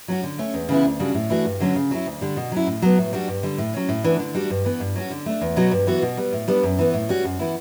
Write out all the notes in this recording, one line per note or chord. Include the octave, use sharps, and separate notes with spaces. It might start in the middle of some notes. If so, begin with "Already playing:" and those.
F#3 C#4 F#4
D3
A3 C#4
E2
C#3 E3 B3 E4
D2
C#3 G3 D4 F#4
A2
E3 A3 D4 F#4
G2
D3 F#3 C#4 F#4
C#3
F#3 C#4 E4
D2
D3 G3
B2
F#3 C#4 E4
A2
F#3 B3
A2
G3 D4 F#4
G2
D3 G3
A2
F#3 C#4
A2
E3 B3 D4
D3
G3 D4 F#4
G2
E3 B3
G2
F#3 C#4 F#4
D3
A3 D4
E2
B2 F#3 B3 F#4
G2
E3 B3 F#4
B2
G3 B3
A2
G3 B3 D4
F#2
E3 B3
A2
G3 C#4 F#4
F#2
E3 B3 E4